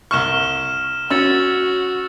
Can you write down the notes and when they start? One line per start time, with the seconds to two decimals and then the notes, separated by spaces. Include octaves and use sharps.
0.11 C2 C#6 F6 E7 G7
1.10 C#4 F#4 E6 A6 C#7